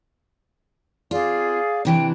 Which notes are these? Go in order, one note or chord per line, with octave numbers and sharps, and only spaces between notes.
C4 F4 G#4 D5 F5
C3 E3 D4 G5